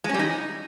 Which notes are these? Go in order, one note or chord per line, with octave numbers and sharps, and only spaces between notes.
G#3
C#4
G3
D#4